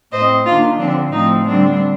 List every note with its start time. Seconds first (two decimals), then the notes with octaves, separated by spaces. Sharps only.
0.12 A2 A3 C4 C5 D#5
0.45 D#3 A#3 D4 F4
0.79 D3 F3 C4 D4
1.12 A2 F3 A3 C4 D#4
1.46 D3 G3 C4 D4